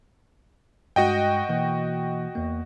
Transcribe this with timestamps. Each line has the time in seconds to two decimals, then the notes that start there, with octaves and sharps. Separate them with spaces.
0.96 G2 G#3 F#4 D#5 G5
1.49 B2 E3 A#3
2.35 E2 A#3